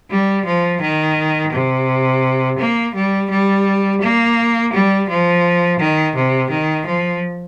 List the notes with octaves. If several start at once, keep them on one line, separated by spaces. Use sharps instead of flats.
G3
F3
D#3
C3
A#3
G3
G3
A#3
G3
F3
D#3
C3
D#3
F3